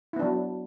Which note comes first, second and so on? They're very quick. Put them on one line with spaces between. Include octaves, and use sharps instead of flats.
E4 B3 D4 F#3